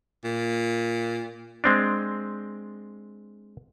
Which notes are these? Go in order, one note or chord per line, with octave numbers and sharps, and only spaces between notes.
A#2
G#3 C4 D4